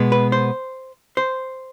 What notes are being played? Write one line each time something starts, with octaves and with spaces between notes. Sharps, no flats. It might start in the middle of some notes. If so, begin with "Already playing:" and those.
Already playing: B2 G#3 B3
B4
C5
C5